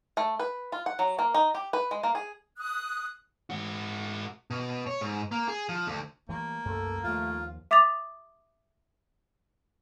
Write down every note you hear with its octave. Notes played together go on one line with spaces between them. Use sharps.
A3
B4
F4
F#5
F#3
A#3
D#4
G4
B4
G#3
A#3
G#4
D#6 F#6
G#2 F#4
B2
C#5
G#2
A#3
G#4
F3
D2
E3 G3 A3 A#3
C2 F#2 A3 A4
D#2 F3 A3 F4
E5 D6 D#6 A6 F7